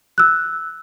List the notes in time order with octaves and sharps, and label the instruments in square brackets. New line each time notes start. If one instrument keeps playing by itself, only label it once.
[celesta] E6 F#6